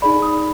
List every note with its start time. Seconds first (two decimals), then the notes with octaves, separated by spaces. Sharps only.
0.02 D#4 G#4 D5 B5
0.22 D#6